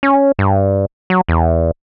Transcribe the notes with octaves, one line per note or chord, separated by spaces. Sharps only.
C#4
G2
F#3
E2